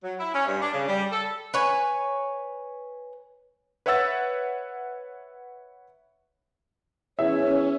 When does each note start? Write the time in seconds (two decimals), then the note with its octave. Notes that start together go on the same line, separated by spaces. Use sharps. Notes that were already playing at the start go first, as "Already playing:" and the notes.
0.03 F#3
0.19 E4
0.34 C#4
0.47 G2
0.61 D4
0.73 C#3
0.88 G3
1.12 A4
1.54 B4 C#5 G#5
3.86 B4 C#5 E5 F#5 E6 A6
7.19 E2 C#4 C#5 E5